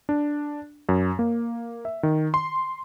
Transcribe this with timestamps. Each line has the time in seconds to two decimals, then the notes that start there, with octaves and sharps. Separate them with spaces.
0.09 D4
0.89 F#2
1.19 A#3
1.85 E5
2.03 D#3
2.34 C6